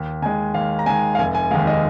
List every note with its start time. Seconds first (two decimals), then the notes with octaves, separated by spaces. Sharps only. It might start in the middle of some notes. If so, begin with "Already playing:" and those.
Already playing: D#2
0.22 D#3 G#3 G#5
0.54 D#2 F5
0.79 A#5
0.86 D#3 G#3 G#5
1.15 F5
1.18 F1 G#5
1.35 G#5
1.51 D#2 D#3 G#3 F5
1.67 D#5